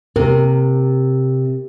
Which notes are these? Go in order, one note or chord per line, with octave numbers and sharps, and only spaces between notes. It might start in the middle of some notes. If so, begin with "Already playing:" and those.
C3 A#4